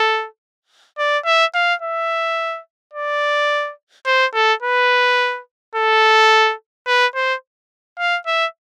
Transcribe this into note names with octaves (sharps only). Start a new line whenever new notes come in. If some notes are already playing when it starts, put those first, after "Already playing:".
Already playing: A4
D5
E5
F5
E5
D5
C5
A4
B4
A4
B4
C5
F5
E5